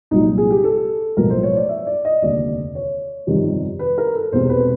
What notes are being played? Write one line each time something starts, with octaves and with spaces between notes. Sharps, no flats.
C2 A#2 F#3 D#4
G#4
G4
A4
B1 A2 F3 A#4
C5
C#5
D5
E5
D5
D#5
F1 D#2 D3 D5
C#5
G1 F2 C3 D#3 G3
B4
A#4
A4
E1 E2 C3 C5
B4